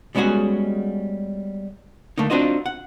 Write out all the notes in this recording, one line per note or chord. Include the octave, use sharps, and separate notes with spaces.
G3 G#3 B3 C#4 F#4 G#4
D3 A3 A#3 D#4
C4 D4 D#4 F4 F#4 D#5
F#5